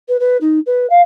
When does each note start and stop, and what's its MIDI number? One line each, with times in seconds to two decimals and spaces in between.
0.08 0.16 71
0.19 0.37 71
0.41 0.59 63
0.66 0.86 71
0.89 1.01 77